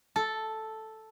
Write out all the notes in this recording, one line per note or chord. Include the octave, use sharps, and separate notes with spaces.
A4